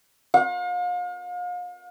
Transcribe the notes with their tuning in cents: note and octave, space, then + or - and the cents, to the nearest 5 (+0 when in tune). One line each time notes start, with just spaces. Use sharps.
F5 +40